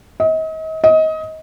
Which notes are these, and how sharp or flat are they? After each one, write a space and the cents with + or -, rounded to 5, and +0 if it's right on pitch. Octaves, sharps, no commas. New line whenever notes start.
D#5 +40
D#5 +25